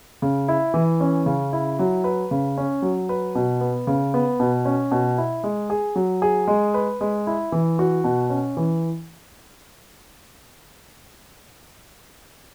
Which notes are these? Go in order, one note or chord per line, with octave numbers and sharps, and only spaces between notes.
C#3
E4
E3
C#4
C#3
E4
F#3
B4
C#3
C#4
F#3
B4
B2
B3
C#3
B3
B2
C#4
B2
E4
G#3
G#4
F#3
G#4
G#3
B4
G#3
E4
E3
F#4
B2
C#4
E3